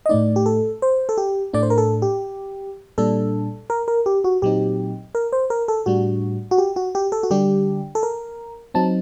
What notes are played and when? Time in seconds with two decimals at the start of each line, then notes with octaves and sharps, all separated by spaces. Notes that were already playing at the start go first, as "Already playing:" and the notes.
0.06 D#5
0.09 A2 A3 D#4 D5
0.36 G4
0.46 A4
0.82 C5
1.09 A4
1.18 G4
1.53 A2 A3 D4 D5
1.63 C5
1.70 A#4
1.78 A4
2.02 G4
2.98 A#2 G3 D4 A4
3.70 A#4
3.88 A#4
4.06 G4
4.24 F#4
4.42 A#2 F#3 C4 D#4 G4
5.15 A#4
5.33 C5
5.50 A#4
5.68 A4
5.86 A2 G3 D4 F#4
6.51 F#4
6.58 G4
6.76 F#4
6.95 G4
7.12 A4
7.23 F#4
7.31 D3 G3 D4 G4
7.95 A4
8.03 A#4
8.74 F#3 C4 D#4 A5